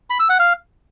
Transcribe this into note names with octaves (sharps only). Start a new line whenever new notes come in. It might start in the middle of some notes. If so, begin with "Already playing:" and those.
B5
E6
F#5
F5